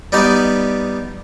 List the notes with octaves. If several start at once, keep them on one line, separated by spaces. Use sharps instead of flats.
G3 B3 D#4 G4 D5